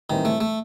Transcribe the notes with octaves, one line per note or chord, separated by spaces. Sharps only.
A2 D#3 E3 G3 C4
A3
A3